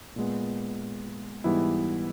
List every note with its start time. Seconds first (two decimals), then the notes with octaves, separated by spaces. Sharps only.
0.16 A#2 G#3 B3
1.44 G#2 E3 G3 B3 E4